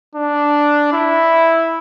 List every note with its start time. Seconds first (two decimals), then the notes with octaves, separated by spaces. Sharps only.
0.15 D4
0.93 E4